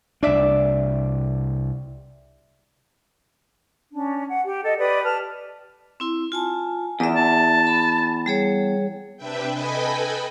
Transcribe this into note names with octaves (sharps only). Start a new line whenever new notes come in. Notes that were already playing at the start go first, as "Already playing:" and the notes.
C2 D4 D5 E5
C#4 D4
F#5
G4
A4 D#5
G4 B4 D5 D#6
A5 F6
C4 E4 C6
F4 G#5 A5
E2 D5 E5
A5
B5
G3 G#4 C#5
C3 D4 B4 E5 G5
A4 B4 D#5 G5 G#5 B5